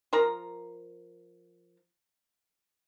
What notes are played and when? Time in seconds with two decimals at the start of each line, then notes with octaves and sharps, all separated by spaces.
0.13 F3 A#4 A#5